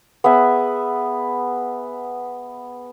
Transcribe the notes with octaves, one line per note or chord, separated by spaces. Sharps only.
B3 G#4 E5